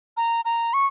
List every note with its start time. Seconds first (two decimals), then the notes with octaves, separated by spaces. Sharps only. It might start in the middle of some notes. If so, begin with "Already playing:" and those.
0.17 A#5
0.45 A#5
0.73 C#6